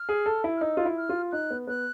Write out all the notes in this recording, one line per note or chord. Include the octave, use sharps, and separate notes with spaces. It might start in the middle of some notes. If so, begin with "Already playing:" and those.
Already playing: F6
G#4
A4
E4
F6
D#4 E6
F4
E4
F6
F4
D#4 F#6
B3
B3 F#6